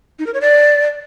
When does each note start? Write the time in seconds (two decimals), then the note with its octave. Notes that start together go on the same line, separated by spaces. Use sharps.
0.19 D#4
0.26 A#4
0.34 C#5
0.41 D5